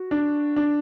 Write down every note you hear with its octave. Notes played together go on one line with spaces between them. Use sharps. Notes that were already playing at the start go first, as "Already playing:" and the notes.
Already playing: F#4
D4
D4